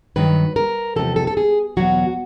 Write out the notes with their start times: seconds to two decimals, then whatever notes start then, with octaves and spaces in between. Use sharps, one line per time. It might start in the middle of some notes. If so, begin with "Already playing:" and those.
0.16 G2 D#3 F#3 B4
0.56 A#4
0.96 E2 C3 F3 A4
1.16 A4
1.27 A4
1.37 G#4
1.77 E2 B2 F#3 F#4